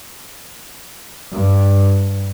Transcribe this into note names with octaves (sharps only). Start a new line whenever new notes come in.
G2